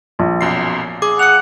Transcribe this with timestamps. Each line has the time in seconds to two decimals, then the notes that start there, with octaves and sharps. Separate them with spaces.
0.19 A#1
0.41 B1 F#2 C7
1.02 G#4 D6
1.19 F#5 C#7 F7